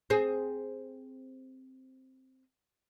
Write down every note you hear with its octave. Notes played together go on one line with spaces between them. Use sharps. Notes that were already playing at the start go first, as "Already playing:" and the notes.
C4 G#4